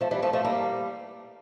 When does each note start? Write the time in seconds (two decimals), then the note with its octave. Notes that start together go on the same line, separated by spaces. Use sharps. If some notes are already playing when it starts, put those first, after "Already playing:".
0.01 F3 A3
0.11 E3 G3
0.23 F3 A3
0.33 F3 A3
0.44 G3 A#3